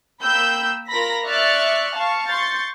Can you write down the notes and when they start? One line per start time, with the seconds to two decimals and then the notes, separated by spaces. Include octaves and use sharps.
0.22 A#3 G5 B5 E6 G6
0.89 F4 A#4 A#5 B5 A#6 B6
1.26 D5 E5 C#6 F6 F#6 A6
1.95 F5 A5 C#6
2.30 C6 C#6 G6 A6